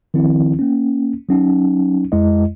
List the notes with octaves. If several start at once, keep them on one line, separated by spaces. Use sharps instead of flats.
D#3 F3 C4 E4
A#3 C#4
F#3 C#4 D#4
F2 G#3 E4 D#5